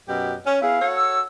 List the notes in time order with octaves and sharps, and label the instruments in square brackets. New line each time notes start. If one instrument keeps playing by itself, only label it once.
[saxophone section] F#2 B2 G4
C#4
[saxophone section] B3 E4 G#4 [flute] F5
[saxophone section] F#4 A4 C#5
[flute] E6